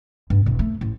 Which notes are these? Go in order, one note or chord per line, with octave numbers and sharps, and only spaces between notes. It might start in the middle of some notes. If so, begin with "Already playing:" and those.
G2
E1
A3
A1